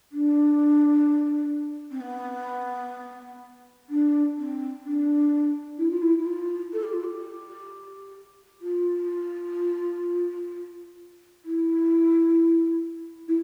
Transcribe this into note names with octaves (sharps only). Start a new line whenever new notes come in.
D4
C4
B3
D4
C4
D4
E4
F4
E4
E4
F4
A4
G4
F4
G4
F4
E4
E4